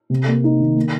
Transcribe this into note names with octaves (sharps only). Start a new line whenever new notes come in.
C3
A#3
D#4
D#3
A#3